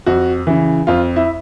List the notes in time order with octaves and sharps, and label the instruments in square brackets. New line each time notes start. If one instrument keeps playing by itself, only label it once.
[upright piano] F2 F#4
C#3 E3
F2 F4
E4